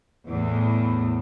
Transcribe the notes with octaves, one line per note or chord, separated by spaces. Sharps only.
E2 A2